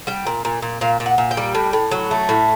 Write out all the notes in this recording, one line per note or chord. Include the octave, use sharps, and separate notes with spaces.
G3 G5
A#2
A#2
A#2
A#2 F5
A#2
F#5
A#2
G5
G3
A2
A2
F#3
A3
A2